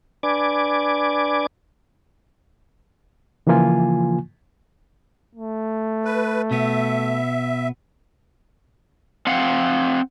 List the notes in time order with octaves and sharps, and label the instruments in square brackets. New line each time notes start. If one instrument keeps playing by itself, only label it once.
[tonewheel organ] D4 B4 D5 G#5 D6
[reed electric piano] C#3 E3 F3 A#3 F4 G#5
[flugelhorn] A3
[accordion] B4
[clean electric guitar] B2 B3 [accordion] E5
[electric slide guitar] C4 F5 F#5